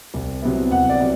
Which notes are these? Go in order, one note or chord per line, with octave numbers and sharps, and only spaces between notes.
C2
C3 F#3 B3 E4
C2 F#5
D5
C3 F#3 B3 E4